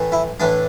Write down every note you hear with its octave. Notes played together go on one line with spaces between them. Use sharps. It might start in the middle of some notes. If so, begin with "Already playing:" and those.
Already playing: A2 E3
E4
A2 E3 D4